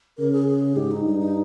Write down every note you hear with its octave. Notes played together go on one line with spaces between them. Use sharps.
C#3 A#4
G#4
G#4
G#2 G4
D#4
G2 D#4
D#4